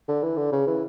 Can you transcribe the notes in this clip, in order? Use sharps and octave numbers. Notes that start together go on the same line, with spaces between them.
D3
E3
D3
C#3
E3